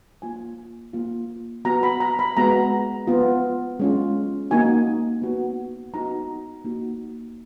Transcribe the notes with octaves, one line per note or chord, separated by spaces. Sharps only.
A#3 F4 G#5
A#3 F4
B3 F#4 A#5
B5
A#5
B5
G#3 B3 F#4 A#5
B3 F4
G#3 C#4 F4
A#3 D#4 F#4 G#5
B3 F#4
B3 D#4 F#4 A#5
A#3 D#4 F#4